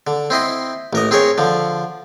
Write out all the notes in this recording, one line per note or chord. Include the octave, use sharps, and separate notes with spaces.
D3
C4 E4 D#5 C6
A1 A#4 D#5
C4 G#4 A#4 C#5
D3 F3